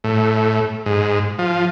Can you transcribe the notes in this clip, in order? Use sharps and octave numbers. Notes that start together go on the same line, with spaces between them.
A2
G#2
F3